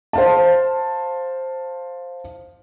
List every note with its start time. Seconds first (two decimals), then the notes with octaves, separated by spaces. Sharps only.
0.13 C5 F5 A5